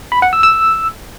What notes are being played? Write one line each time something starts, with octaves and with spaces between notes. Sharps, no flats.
B5
F#5
E6
E6